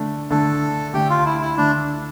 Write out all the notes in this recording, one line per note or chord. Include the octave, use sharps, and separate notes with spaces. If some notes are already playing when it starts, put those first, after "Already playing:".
Already playing: D3 A3 D4
D3 A3 D4 A4
D3 A3 D4 G4
F4
E4
E4
D3 A3 D4